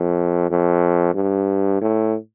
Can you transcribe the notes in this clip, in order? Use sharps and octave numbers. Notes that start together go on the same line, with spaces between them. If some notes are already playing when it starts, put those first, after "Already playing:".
Already playing: F2
F2
G2
A2